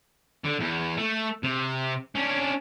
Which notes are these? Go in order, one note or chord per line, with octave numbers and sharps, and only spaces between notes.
D3
E2
A3
C3
C#4 D4